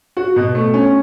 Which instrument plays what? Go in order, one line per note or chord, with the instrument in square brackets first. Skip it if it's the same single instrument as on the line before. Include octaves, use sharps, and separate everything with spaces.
[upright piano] F#4
B2
A3
C#4